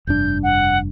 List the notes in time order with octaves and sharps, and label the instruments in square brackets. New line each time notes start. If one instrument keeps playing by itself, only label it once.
[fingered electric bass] F1 G2 D4 [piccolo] G6
[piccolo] F#5